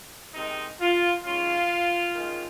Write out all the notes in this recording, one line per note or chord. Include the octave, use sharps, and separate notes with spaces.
C3 D#3 G#3 C4 D#4
F4
G#2 F#3 C#4 F4
D#3 G#3 C#4